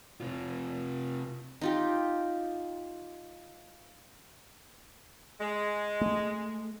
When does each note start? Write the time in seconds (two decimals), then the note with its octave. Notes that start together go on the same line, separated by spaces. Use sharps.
0.21 C3 F4
1.61 D#4 F4 G4
5.41 G#3
6.01 A3